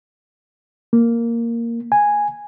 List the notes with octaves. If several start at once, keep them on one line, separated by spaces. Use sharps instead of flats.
A#3
G#5